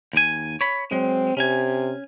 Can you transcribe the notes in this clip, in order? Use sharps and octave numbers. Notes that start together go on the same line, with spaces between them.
D#2 G#5
C#5 B5
F#3 G#3 C4
C3 C#4 G#5